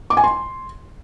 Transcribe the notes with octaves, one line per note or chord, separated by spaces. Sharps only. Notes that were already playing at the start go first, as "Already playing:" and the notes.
D6
G#5
C6